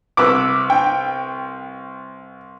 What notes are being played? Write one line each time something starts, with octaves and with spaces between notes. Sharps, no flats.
C2 B4 D6 E6 F#6
G5